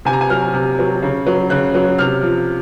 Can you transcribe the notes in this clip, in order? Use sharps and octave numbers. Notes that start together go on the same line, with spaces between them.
C3 G#5
A#5
G#5
F#3 F6
C3
F#3
C#3
F#3
C#3 F#6
F#3
C3 F6
F3